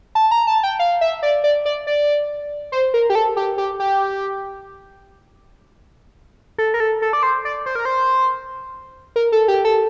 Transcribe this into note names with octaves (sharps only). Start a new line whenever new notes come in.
A5
A#5
A5
G5
F5
E5
D5
D5
D5
D5
C5
A#4
G4
A4
G4
G4
G4
A4
A#4
A4
A4
D5
C5
D5
C5
A#4
C5
A#4
A4
G4
A4